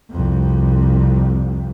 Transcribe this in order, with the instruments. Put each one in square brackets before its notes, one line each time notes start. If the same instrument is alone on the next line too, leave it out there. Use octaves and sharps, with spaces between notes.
[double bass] C2 F2